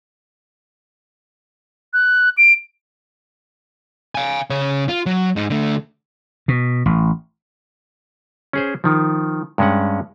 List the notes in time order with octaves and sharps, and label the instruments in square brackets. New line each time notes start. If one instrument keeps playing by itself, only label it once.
[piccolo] F#6
D7
[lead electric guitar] F5 G#5
C#3 C#5
F4
F#3
G#2 D#4
D3 A3
[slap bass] B2
A1
[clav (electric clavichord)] C#4 G#4 C5
D#3 F3
G2 G#3 C#4 F#5